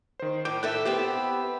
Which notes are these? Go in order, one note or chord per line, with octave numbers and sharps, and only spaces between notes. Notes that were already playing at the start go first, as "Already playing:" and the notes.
D#3 C5
A2 D6 G6 D7
A2 A4 E5 F#6 G6
B3 C4 E4 G4